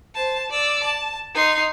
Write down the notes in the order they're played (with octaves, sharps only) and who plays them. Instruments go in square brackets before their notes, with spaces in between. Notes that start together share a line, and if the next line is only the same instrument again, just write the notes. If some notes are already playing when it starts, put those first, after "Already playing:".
[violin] C5 A5
D5 E6
A5
D#4 C6